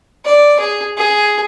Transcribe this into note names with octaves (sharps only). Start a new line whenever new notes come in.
D5
G#4
G#4